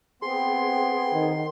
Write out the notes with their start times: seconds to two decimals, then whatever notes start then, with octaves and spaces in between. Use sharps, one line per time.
0.22 B3 C4 G#4 C6
1.14 D#3